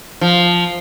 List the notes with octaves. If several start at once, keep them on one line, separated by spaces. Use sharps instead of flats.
F3